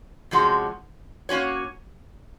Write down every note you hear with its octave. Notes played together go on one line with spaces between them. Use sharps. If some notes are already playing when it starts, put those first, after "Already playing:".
C3 F3 G#3 C#4 F#4
A#3 C#4 F#4 C#5